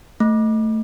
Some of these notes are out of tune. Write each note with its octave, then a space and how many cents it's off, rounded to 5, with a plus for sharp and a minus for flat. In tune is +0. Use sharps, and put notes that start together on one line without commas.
A3 +10